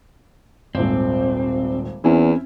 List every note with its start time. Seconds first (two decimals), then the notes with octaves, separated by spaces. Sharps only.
0.75 D#1 G#1 C4
2.04 E2 C4 C#4 E4